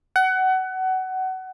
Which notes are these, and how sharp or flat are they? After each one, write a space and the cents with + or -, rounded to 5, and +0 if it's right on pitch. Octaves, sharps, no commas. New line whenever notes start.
F#5 +25